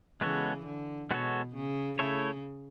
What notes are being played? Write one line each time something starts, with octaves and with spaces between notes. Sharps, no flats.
C#3 E3 G#3 B3 F#4 A4 C#5
D3
B2 G#3 B3 F#4 A4 C#5
C#3
C#3 A3 E4 A4 C#5